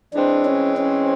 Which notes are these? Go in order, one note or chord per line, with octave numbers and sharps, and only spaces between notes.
E3 G#3 C4 D4
C#4
C#4